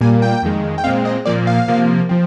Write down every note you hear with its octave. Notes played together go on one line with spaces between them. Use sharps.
A#2 G3 A#3 G#5
G5
F2 D#3 G#3
G5
A#2 G#3 C4 F5
D#5
A#2 F3 A#3 D5
F5
C3 F3 A#3
F3 C4